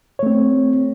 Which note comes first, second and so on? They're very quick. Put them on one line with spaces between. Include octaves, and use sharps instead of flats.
C#5 A3 C4